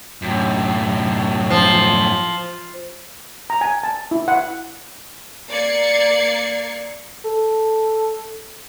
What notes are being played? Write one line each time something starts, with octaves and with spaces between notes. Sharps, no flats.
F#2 A2
F3
A#5
G#5
A5
E4
F#5
A#3 D5 G#6 C7 C#7
A4